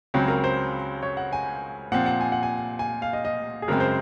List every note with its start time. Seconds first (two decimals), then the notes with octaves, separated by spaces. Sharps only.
0.14 C#2 C#3 F#3 C4 C#5
0.28 A#4
0.44 C5
1.03 C#5
1.17 F#5
1.33 G#5
1.92 A#2 F3 C4 F#5
2.06 F#5
2.21 G#5
2.32 F#5
2.43 G#5
2.79 G#5
3.02 F5
3.13 D#5
3.25 D#5
3.62 G#4
3.68 F#2 C#3 G#3 C4 A#4
3.80 C5